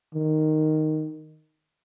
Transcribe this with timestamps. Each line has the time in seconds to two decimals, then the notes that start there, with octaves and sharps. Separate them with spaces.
0.14 D#3